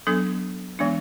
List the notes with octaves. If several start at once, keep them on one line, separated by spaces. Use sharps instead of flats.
F#3 B3 D4 A4
E3 G#3 B3 D4